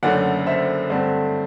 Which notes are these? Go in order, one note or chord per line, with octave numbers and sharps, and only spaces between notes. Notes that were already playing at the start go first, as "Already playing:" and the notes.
F#1 F#2 D3 A3 D5 F#5
C5 E5
G2 D3 A3 C4